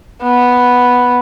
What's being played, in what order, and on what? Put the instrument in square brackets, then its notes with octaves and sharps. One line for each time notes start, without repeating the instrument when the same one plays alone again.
[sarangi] B3